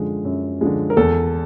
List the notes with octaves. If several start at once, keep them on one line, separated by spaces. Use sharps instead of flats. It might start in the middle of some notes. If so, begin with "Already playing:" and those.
Already playing: F#2 D3 F3 G#3
F#2
D3 F3 G#3
A#4
E2 A4